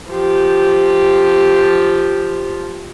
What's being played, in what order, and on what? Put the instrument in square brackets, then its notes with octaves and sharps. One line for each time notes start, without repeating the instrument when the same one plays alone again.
[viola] F3 G4